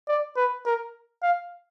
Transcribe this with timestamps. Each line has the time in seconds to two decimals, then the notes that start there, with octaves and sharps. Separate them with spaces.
0.08 D5
0.36 B4
0.66 A#4
1.23 F5